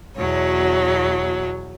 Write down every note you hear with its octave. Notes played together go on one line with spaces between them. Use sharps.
E2 B2 F#3 C#5